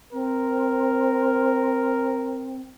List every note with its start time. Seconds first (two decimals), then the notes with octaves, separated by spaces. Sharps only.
0.13 C4 A#4